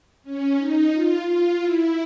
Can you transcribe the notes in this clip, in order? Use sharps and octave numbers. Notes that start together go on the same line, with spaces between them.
C#4
D#4
F4
F4
E4